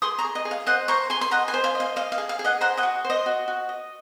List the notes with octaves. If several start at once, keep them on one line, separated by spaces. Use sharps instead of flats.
G#4 C6 D#6
A#5 C#6
G#4
D#5
G#4
F5
C5 D#5 F#5
C5 A#5 C#6
G#4 G#5 C6
C6
D#5 F#5 A#5
G#5 C6
C5
F5 G#5
D#5
F5
D#5 F5
F5
G#4
F5
G#4
D#5 F#5
C5 F#5 A#5
D#5 F#5
F#4
C5
D#5
F#4
F#4
D#5